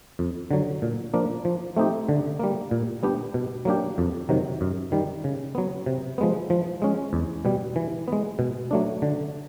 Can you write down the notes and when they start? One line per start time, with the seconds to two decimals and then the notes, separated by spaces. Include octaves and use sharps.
0.19 F2
0.51 D3 F#3
0.82 A#2
1.14 F3 A#3 D4
1.45 F3
1.77 A3 C4 D#4 G4
2.09 D3
2.39 G3 A#3
2.71 A#2
3.03 G3 B3 D4 G4
3.34 B2
3.65 F#3 A#3 D4 G4
3.98 F2
4.29 C3 D#3 F#3
4.61 F#2
4.92 D#3 G3
5.24 C#3
5.55 F#3 B3
5.86 C3
6.18 F3 G#3 B3
6.50 F3
6.82 G#3 C#4
7.13 E2
7.45 B2 G3
7.76 E3
8.08 G#3 B3
8.39 B2
8.71 F#3 A3 D4
9.02 D3